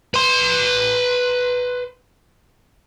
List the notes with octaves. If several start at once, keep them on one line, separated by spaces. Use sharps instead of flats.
B4 C6